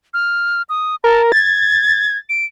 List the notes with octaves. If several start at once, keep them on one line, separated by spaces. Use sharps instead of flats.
F6
D#6
A#4 A5
G#6 A6
D7